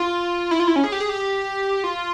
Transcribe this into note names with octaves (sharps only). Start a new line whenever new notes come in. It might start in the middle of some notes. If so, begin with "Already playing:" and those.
Already playing: F4
E4
F4
E4
C#4
G#4
G4
G#4
G4
F4